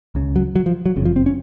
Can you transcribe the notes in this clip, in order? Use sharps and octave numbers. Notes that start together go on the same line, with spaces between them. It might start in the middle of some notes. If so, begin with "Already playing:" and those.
C#2 C#3
F#3
F#3
F3
F#3
F#1 F2 C#3
F3
C4
C#4